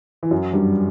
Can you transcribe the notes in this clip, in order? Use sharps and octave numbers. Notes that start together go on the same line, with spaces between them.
E3
F#2 F#3
G2 G3